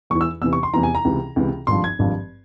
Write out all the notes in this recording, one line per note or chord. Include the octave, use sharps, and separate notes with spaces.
E2 C#6
E3
E6
E2 C3 E3 E6
C#6
C6
E2 C3 E3 A#5
G#5
A#5
C#2 C3 E3
C#2 C3 E3
G#1 G2 F3 C6
G#6
G#1 G2 F3